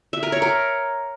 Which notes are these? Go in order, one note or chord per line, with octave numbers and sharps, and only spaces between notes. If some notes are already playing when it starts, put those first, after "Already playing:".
E5
A#4
C#5
A#4